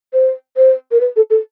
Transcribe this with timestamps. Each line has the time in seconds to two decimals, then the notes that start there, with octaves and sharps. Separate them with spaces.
0.13 C5
0.57 C5
0.92 A#4
1.01 B4
1.16 A4
1.30 A4